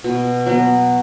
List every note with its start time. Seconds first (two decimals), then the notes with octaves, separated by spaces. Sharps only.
0.04 B2
0.46 F#3 B3